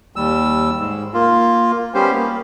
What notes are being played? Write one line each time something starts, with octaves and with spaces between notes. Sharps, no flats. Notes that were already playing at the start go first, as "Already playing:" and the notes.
D#2 G3 E6
G#2
A#3 F4
G3 B3 C#4 G4 C5
A#3